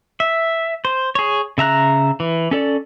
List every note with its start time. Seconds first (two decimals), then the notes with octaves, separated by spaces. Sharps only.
0.20 E5
0.85 C5
1.15 G#4 C#5
1.58 C#3 E5 A#5 F#6
2.20 E3
2.51 C#4 A4 D5